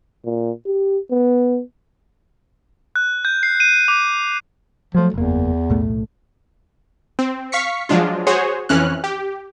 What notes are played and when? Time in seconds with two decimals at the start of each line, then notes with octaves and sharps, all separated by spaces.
0.25 A#2
0.66 G4
1.11 B3
2.96 F#6
3.25 G6
3.43 C7
3.60 D#7
3.88 D6
4.95 F3 F#3 A3
5.14 F#1 E2 A#3
5.70 B1 A2 A3
7.19 C4
7.52 F5 C#6 B6 C#7
7.89 F3 F#3 G#3 D4 F4
8.27 F#4 G#4 C5 C#5
8.69 F2 E3 C#4 F6 F#6
9.04 G4